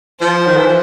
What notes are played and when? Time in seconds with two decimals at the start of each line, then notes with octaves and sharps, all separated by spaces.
0.20 F3 C5
0.46 D#3
0.57 E3
0.67 F3